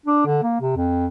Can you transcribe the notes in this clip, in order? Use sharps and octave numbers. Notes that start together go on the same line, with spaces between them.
D4
D3
A#3
C3
F2